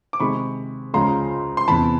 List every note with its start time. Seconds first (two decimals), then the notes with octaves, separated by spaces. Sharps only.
0.13 D6
0.20 C3 D#3 G#3 B5 C#6
0.94 C#2 C#3 F3 G#3 C#4 A#5 C6
1.57 C6
1.68 E2 C3 E3 A5 B5